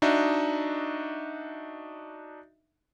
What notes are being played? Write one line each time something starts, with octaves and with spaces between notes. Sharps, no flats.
D4 D#4 F#4 D#5 E5